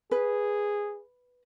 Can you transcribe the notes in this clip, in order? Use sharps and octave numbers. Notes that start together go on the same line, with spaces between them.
G#4 B4